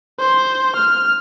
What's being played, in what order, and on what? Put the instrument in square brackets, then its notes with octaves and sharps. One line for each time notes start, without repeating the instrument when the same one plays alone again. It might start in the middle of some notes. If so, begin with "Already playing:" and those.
[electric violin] C5
F6